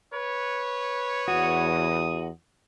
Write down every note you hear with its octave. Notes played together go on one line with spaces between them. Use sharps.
B4 C#5
E2 F#4 D#6